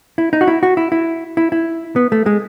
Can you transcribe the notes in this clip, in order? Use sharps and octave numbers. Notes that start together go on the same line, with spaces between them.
E4
D#4
F#4
E4
F#4
E4
E4
E4
E4
B3
A3
G#3